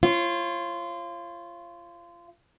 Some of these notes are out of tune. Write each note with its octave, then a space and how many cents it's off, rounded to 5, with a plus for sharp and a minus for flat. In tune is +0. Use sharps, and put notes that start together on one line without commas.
F4 -25 C#5 -40